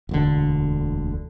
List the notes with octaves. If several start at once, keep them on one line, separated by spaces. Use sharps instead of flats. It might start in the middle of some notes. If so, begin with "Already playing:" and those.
E1 D2 D3